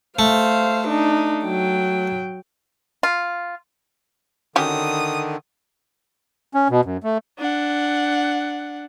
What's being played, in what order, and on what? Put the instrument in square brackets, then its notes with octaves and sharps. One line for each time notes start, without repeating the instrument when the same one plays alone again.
[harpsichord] A3 [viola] C5 F5
[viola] D4 D#4
F#3 G5
[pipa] F4
[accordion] D3 D#3 [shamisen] C#4 F#4 G4 [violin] D#6
[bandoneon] C#4
B2
F#2
A3
[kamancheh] D4 F#5